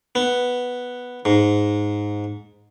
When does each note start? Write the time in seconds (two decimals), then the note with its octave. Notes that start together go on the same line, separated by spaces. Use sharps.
0.15 B3
1.25 G#2